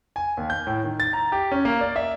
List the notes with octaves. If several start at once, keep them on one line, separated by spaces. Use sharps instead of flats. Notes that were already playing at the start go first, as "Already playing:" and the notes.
G#5
D#2
G6
A2
D#3
A6
A#5
G4
C#4
A#3
D5
E5